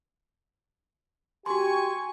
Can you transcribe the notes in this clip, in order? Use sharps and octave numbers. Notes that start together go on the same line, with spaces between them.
F#4 G4 G#5 C6 C#6